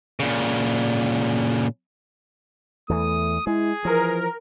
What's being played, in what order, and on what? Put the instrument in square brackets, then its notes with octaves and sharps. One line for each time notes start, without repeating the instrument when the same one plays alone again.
[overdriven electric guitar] A#2 C#3
[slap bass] E2 E3 [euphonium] A3 [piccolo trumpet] D#6
[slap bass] G#3 [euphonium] E4 [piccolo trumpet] G#4
[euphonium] E3 [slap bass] F3 [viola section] A#4